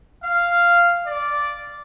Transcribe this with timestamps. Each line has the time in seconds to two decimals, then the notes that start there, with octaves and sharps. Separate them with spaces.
0.23 F5
1.07 D5